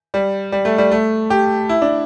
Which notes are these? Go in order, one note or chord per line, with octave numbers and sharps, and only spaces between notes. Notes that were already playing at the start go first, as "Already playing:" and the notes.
G3
G3
A3
G3
A3
G4
E4
D4